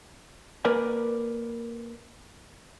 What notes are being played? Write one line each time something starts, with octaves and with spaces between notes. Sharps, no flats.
A#3 A#4 B4 D5 G#5